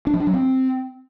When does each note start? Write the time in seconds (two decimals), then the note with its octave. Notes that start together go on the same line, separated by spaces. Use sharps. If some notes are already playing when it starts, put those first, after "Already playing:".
0.07 D4
0.14 F3
0.20 D4
0.27 F#3
0.34 C4